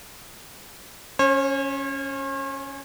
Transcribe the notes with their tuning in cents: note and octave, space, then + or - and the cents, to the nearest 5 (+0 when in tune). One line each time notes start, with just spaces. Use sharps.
C#4 +0 C#5 -45